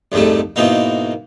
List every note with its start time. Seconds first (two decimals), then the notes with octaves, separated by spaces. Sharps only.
0.12 C2 F2 G#2 G3 A3
0.56 G#2 B2 E3 A#3 D#4